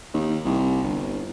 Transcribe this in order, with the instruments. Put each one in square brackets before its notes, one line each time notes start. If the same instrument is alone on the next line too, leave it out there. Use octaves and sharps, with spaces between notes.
[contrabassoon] D#2
C2
G1